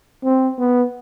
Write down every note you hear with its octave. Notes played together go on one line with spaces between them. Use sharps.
C4
B3